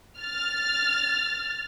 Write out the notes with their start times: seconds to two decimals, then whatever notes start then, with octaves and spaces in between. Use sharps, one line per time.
0.18 F6 A6